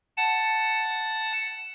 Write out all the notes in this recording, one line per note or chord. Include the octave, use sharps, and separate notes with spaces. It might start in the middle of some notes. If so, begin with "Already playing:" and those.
F#5 A5